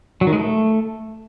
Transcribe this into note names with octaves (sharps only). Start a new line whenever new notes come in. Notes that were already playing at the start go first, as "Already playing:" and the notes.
F#3
D#3
G#3
A3